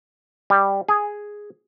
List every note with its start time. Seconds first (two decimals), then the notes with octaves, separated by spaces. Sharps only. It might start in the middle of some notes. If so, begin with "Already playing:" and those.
0.50 G3
0.89 G#4